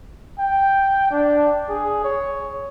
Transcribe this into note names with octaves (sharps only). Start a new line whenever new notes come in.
G5
D4
G#4
C#5